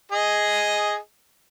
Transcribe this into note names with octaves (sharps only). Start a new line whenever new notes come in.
G#4 D#5